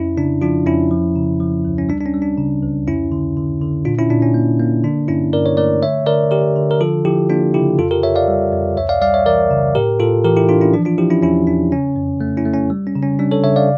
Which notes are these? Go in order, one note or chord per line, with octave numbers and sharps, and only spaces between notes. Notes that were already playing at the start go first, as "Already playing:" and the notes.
Already playing: F2 C#4 E4
C#3 D4
F3 D4 F4
F2 C#4 E4
F3
C#3
F3
D2
C#4
G3 D4
D4
C#4
G3
D4
C#3
C#2
F2 C#4 E4
D3
D3
D3
A#2 D4 F4
C#4 E4
A#2 D4
C#4
A#3
A#3
D3 D4
G2 C#4 E4
G2 A#4 D5
C#5
A3 A#4 D5
D3 C#5 E5
D3 A#4 D5
D3 G4 A#4
D3
A#4
F3 F4 A4
F3 E4 G4
A#3 D4 F4
C#3 E4 G4
F2 F4 A4
G4 A#4
F2 C#5 E5
D5 F5
G3
F2
C#2 C#5 E5
D5 F5
G3 D5 F5
C#5 E5
E3 A#4 D5
C#3
A2 G4 A#4
A2 F4 A4
E3 G4 A#4
E4 G4
E3 D4 F4
C#4 E4
F3 D4
D4 F4
F3 E4 G4
C#4 E4
E2 C#4 E4
E2 D4
C#3 C#4
F2
A3
C#4 E4
A3
C#4
G3
C#4
C#3
C#4
G3 D4
A4 C#5
C#3 C#5 E5
D5 F5